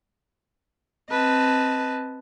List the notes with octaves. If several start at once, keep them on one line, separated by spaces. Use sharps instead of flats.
C4 B4 D#5 A5